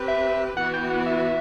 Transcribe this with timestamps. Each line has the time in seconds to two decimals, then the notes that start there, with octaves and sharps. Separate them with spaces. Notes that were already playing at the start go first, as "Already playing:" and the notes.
Already playing: C4 G4 B4
0.08 E5
0.57 E3 B3 F#4 F#5
0.74 G5
0.90 F#5
1.06 E5